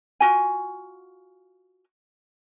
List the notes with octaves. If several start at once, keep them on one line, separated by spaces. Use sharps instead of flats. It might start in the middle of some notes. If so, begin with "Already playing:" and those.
F4 F#4 G#5